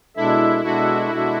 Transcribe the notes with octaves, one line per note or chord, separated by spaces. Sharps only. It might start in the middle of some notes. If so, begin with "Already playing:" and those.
B2 G#3 D4 E4 A4 E5
B2 G#3 D4 F#4 A4 E5
B2 G#3 D4 A4 E5